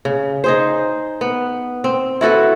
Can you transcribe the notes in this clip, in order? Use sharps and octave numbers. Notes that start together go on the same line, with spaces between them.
C#3
D#4 G#4 C5
B3
C4
E4 F#4 A4 B4